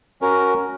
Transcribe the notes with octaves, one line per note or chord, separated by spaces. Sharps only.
C#4 F#4 A#4